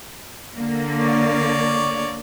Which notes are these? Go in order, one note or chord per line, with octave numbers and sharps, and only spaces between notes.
D3 A#3
C#5 D5